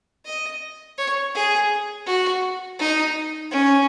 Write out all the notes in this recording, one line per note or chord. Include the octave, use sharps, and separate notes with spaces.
D#5
C#5
G#4
F#4
D#4
C#4